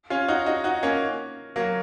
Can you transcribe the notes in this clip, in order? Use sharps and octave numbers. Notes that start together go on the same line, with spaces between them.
C#4 F4
D#4 F#4
D#4 F#4
D#4 F#4
A#3 C#4
F#3 A#3